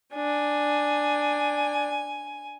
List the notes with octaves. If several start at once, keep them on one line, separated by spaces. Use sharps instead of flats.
D4 G#5